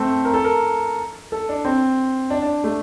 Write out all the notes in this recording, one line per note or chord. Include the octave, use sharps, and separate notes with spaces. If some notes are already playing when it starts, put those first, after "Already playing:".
Already playing: A3 C4 A4
A#4
A4
A#4
A4
D4
C4
D4
D4
A3